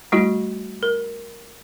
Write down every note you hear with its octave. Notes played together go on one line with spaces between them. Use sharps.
G3 A3 E4 F#4
A#4